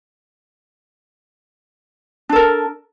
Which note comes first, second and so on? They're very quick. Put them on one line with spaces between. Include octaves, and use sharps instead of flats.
D4 A4 A#4